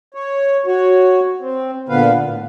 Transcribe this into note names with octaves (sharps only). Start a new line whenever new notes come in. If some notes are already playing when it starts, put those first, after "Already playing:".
C#5
F#4 C#5
C4
A#2 D3 B3 B4 F5
A2